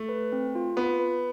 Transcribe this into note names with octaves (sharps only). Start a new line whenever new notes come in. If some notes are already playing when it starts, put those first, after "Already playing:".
Already playing: A3
B4
C4
F4
B3 F4
B4